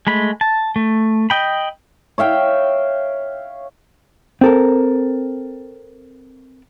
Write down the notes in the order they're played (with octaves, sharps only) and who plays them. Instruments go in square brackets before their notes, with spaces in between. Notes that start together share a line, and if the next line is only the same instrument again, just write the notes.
[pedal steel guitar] G#3 A3 B5
A5
A3
D#5 G5 B5
[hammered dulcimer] C#5 E5 F5 G5
[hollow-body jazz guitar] C4 A4 A#4